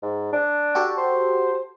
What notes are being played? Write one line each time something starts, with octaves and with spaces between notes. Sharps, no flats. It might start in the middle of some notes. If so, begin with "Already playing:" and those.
G#2
D4
F#4 G4 A4
C5